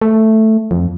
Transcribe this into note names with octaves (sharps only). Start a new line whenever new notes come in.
A3
F2